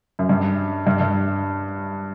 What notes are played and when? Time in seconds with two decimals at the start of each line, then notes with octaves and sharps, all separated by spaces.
0.19 F#2
0.29 G2
0.87 G2
1.01 G2